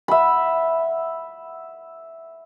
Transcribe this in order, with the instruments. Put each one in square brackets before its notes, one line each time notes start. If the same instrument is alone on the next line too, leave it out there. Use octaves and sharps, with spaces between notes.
[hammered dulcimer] E5 F#5 B5